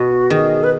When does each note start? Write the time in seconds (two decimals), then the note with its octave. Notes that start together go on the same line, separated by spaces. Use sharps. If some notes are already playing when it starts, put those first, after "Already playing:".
Already playing: B2 F#4
0.30 D#3 G#4
0.64 B4